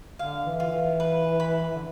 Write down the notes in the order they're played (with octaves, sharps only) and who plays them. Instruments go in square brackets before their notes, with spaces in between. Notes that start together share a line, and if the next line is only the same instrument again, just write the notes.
[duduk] D3 [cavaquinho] F5
[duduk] E3
[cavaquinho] F4
[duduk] E3
[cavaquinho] B4
B5
[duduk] D3